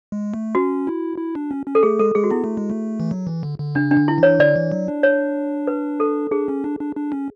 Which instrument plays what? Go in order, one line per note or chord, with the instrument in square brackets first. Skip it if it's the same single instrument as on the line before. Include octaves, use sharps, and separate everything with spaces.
[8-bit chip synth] G#3
A3
[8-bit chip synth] C#4 [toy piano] F#4
[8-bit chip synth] E4
E4
D4
C#4
C#4
[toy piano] A4
[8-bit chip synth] A3 [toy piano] G#4
[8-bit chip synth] G#3 [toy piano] A4
[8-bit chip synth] G#3 [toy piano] G#4
[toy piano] F#4
[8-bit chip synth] B3 [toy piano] E4
[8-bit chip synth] A3
G#3
A3
E3
F#3
E3
D3
D3
[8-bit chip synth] C#3 [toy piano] D4
[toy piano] D4
[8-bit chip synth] D3
[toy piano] E4
[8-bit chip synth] E3 [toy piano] C#5
[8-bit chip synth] D3 [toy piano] D5
[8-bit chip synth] E3
F#3
D4
[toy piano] C#5
B4
A4
[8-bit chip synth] D4 [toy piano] G#4
[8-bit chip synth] C#4
D4
D4
D4
C#4